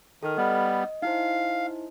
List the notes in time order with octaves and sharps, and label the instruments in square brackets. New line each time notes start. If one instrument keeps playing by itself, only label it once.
[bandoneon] D#3 [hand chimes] A4 F6
[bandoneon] G3 B3 [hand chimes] D#5
[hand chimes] D#4 E4 C5 [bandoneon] F5